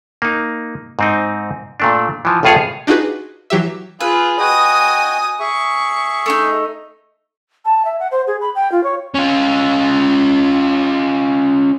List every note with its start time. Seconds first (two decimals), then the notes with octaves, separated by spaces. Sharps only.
0.22 A#3 D#4
0.99 G#2 C4 D#4
1.80 A#2 A3 D4
2.25 E3 F3
2.43 A1 F2 A2 F4 G#4 C#5
2.87 D4 D#4 F4 F#4 G#4 B4
3.50 E3 F#3 G4 E5
4.01 F4 G#4 B4 F5 E6
4.39 F#4 D#5 G5 G#5 D#6
5.40 G#4 E5 C#6
6.26 A3 D4 D#4
7.65 A5
7.85 E5
8.00 F#5
8.11 C5
8.27 G#4
8.41 B5
8.55 G5
8.72 F4
8.84 C#5
9.14 C#4 F4